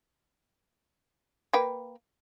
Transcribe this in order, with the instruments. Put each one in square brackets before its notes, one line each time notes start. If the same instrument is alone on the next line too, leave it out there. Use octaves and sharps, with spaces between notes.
[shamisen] A#3 B4 G5